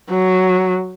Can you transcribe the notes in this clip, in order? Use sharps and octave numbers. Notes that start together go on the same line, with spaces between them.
F#3